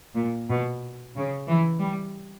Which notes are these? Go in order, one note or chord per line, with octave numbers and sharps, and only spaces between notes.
A#2
B2
C#3
E3
G3